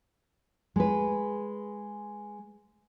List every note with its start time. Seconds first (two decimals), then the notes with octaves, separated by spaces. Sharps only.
0.76 G#3 B4